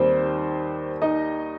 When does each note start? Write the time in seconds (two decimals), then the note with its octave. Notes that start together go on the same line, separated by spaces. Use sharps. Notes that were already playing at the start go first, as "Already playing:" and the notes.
Already playing: D#2 D#3 G3 C4 C5
1.02 D#4 D#5